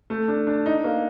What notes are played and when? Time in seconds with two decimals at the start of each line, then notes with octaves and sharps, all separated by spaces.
0.10 A3
0.28 D4
0.47 D4
0.66 D#4
0.84 A#3